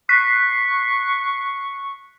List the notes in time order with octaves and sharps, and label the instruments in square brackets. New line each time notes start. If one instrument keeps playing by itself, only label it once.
[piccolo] C#6 [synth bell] F#6 B6 C7